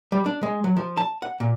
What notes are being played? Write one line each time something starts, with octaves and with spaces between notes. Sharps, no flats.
G3
D4
G#3
F#3
F3
A5
F#5
A#2